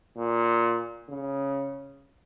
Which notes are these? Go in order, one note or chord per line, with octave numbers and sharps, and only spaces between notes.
A#2
C#3